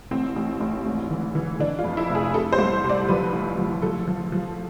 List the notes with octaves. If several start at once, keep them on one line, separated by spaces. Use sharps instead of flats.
A1 C4
A1
A1
G#1
E3
E3
E3 D4
F4
F2
E4
F1
G#4
C3 A4
C5
C2
C3
D5
F3 B4
A1
F3
F3 A4
F3
F3